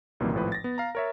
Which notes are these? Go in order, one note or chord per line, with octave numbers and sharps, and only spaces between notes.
C2 F#2 A#2 D#3 E3 A#3
G#1 A2 F3 B4
A6 A#6
B3
F5 A#5
A#4 C#5 E5